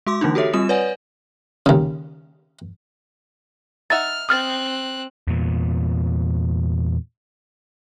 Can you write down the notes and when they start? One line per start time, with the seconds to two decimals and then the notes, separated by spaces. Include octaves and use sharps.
0.06 G#3 F#4 C6 D6
0.21 D3 E3 A#3 D4 D#4
0.35 F#4 G4 A4 C#5 E5
0.53 G3 C4 F4 D#6 E7
0.69 B4 C#5 D5 F#5 G#5
1.66 D#2 C#3
3.90 D#4 E5 F#5 F6 A6
4.29 C4 D#6 F6 F#6 A6
5.27 E2 A#2